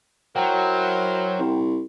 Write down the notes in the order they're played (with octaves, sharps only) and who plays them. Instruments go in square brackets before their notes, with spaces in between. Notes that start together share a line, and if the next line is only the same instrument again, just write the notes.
[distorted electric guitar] F#3 [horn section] E4 A#4 C5 [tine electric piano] F#5 G5 A#5
[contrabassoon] C2